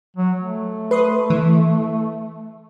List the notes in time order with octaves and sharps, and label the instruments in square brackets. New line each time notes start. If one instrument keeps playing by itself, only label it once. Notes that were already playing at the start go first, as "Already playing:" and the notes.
[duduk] F#3
A3
[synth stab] B4 C6 D#6
E3